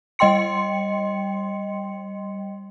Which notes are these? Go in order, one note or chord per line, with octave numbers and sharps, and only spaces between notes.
G3 D#5 G5 C6 C#7